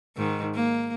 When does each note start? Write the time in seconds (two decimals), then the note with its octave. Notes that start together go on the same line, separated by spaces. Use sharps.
0.17 G#2 D#3
0.55 A#3